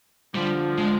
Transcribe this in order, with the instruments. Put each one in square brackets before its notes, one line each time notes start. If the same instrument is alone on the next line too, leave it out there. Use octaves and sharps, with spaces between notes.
[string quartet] D3 F3 [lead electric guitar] G3
[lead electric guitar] G#3